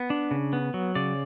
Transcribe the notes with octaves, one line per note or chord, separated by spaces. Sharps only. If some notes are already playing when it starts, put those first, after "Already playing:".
Already playing: B3
D4
C#3
B3
F#3
C#3 D5